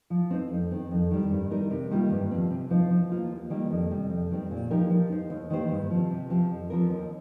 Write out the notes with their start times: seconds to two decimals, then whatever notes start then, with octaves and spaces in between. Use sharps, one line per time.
0.10 F3
0.30 C4 D#4 C5
0.50 F2
0.71 D#3 C4
0.91 F2
1.11 D#3 G3
1.31 G2
1.51 G3 D#4 A#4
1.71 C3
1.91 D#3 G3 A#3 F4
2.10 G2
2.31 F3 C4
2.50 C3
2.70 F3 D#4 C5
2.90 F3
3.10 A#3 F4 C5
3.30 D#2
3.50 D#3 G3 A#3
3.70 F2
3.91 C3 G3
4.10 F2
4.31 D#3 G3 C4
4.51 A#2
4.71 F3 D#4 G4 A#4
4.90 F3
5.10 D#4 C5
5.30 D#2
5.50 D#3 A#3 G4 C5
5.71 G2
5.90 F3 C4
6.10 C3
6.30 F3 C4 G4
6.51 F2
6.70 F3 C4 F4 A#4
6.90 D#2